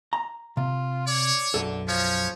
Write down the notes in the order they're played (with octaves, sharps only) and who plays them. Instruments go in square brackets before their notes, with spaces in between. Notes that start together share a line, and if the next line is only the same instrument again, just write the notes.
[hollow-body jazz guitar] A#5
[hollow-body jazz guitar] C3 [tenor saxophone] F4
[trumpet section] C#5 [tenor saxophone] D5
[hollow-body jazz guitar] B1 F#2 A4 [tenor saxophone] D3
[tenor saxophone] F3 [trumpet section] C#4 C#5